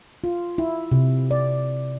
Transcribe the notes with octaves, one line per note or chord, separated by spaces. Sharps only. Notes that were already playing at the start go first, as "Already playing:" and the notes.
F4
E4
C3
D5